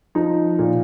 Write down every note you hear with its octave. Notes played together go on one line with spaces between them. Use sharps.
F3 D#4
A#2